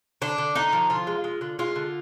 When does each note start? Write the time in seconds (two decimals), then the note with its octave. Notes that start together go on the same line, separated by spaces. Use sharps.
0.22 D3 D4
0.38 D3
0.55 D3 D#4
0.73 F3
0.90 D3 F4
1.07 G#3
1.24 G#3
1.41 D3
1.59 G#3 F4
1.76 D3